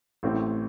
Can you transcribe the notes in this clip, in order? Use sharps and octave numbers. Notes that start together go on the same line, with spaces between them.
A1 A2 A3 C4